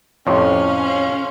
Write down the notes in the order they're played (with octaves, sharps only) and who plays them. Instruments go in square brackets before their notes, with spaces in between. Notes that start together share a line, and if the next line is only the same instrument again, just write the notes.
[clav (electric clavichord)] F2 A2 C3 [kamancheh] C#4 F5 [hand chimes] C#5 C6 C#6